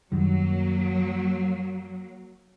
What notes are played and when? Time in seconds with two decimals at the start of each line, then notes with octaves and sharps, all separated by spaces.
0.12 F#2 D#3 F#3 G3 A#3